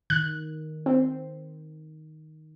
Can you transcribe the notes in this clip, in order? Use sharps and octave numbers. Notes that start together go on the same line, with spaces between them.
D#3 F#6
C4